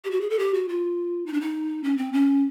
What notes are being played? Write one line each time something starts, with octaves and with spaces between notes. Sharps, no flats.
G4
F#4
G#4
A4
G4
F#4
F4
D#4
D4
D#4
C#4
C4
C#4